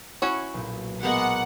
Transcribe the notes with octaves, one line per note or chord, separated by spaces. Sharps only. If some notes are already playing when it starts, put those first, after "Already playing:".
C#4 E4 F#4 C#5
B1 A#2
G#3 A#3 B3 F#5